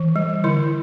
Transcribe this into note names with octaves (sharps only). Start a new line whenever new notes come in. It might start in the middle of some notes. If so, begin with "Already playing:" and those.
Already playing: E3
G3
D3 E4